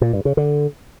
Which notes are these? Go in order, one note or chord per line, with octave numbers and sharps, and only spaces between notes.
A#2
G2
C#3
D3